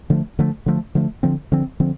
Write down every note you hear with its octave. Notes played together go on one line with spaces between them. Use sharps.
D3 F3 A3
D3 F3 A3
D3 F3 A3
D3 F3 A3
D3 F3 C4
D3 F3 C4
D3 F3 C4